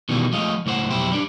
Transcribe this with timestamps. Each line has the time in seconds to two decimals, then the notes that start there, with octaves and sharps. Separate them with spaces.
0.09 B2 D#3 E3 G3 A#3
0.32 F3 G#3 A3 D#5 F5
0.66 C#2 A2 F#4 C5 F#5
0.90 B1 F2 E4 G4 C5
1.11 G3 D4